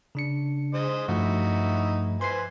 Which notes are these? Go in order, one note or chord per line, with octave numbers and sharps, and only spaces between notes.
C#3 D4 C#7
G#3 C5 D#5
G2 F3 A3 D#4 E4 F#4
B4 C5 G#5 C6 C7